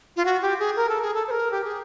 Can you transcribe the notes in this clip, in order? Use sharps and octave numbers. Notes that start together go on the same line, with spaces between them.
F4
F#4
G4
G#4
A#4
A4
G#4
A4
C5
A#4
G4
G#4